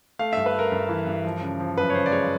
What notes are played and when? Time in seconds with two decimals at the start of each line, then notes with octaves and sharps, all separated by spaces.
0.19 A3 F5
0.33 G2 E5
0.46 B4
0.55 A3 A#4
0.72 G2
0.89 E3
1.07 G2
1.24 F3
1.42 C#3
1.60 F3
1.77 F#2 B4
1.90 C#5
1.94 C#3 C5
2.06 D5
2.12 G#3 C#5